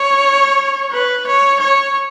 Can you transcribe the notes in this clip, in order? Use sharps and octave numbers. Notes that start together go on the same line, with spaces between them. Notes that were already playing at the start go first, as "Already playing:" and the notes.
Already playing: C#5
B4
C#5
C#5